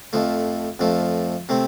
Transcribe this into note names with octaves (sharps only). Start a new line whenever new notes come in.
F2 F3 A3
F2 F3 A3
C3 A3 C4